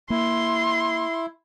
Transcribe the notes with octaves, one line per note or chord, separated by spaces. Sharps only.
A#3 E4 C6